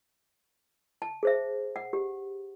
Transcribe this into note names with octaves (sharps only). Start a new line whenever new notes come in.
A5
G#4 C5 E5
F#5
G4